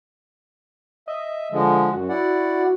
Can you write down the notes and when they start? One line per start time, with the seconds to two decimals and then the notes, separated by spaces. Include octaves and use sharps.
1.08 D#5 E5
1.52 D3 F3 G#3
1.92 F#2 F#4
2.09 E4 D5 F#5